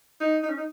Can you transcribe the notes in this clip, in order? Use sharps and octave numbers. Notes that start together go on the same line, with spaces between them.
D#4
D#4
C#4
D#4